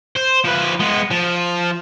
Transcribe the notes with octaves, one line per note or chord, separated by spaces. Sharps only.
C5
F3 B4
G#3 B3
F3